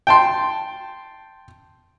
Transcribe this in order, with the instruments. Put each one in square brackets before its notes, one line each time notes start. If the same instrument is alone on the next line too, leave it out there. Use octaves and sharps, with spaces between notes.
[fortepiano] G5 A5 C6